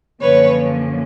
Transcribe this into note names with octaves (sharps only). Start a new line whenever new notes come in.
F#2 D3 F3 A#3 C#4 B4 C#5